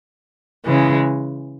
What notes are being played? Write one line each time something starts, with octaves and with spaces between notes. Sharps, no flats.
C#3 E3 G#3